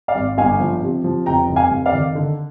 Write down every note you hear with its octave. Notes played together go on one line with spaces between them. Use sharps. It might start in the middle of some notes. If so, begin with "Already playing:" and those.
D5 F5
G#1
G1 F5 G#5
F3
C3
F3
F1 G5 A#5
F1
F5 G#5
F1
D5 F5
D#3
D3